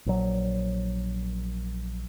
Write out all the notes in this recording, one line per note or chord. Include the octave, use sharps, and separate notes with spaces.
A#1 F#3